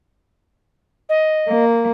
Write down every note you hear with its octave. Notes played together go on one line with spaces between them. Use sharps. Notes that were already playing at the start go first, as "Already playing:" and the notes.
D#5
A#3